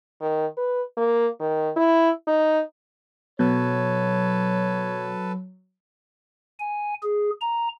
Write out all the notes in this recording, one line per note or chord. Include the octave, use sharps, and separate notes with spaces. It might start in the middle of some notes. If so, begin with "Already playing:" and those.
D#3
B4
A#3
D#3
E4
D#4
B2 F#3 A4 B4 C#5
G#5
G#4
A#5